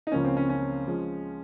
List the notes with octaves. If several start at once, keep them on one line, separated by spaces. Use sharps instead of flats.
D#4
C#2 C#3 F3 A#3 C#4
C4
C#4
C#4
F3 G#3